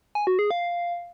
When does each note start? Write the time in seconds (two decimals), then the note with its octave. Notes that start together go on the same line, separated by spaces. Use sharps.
0.15 G#5
0.27 F#4
0.39 G#4
0.51 F5